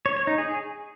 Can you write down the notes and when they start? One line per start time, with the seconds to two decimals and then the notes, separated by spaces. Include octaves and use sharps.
0.06 C#5
0.16 C#5
0.27 D#4
0.38 G#4